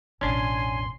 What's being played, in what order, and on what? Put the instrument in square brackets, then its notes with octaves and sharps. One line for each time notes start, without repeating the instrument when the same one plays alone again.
[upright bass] E1 A1 [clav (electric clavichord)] C#4 D4 [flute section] C#5 G#5 [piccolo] C6